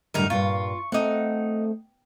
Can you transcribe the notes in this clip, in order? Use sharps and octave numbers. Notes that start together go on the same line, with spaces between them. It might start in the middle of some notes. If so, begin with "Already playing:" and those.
F#2 A2 D3 G3 D#4 A#4
G2 A#2 F4 C#6
A3 C4 D#4 F#5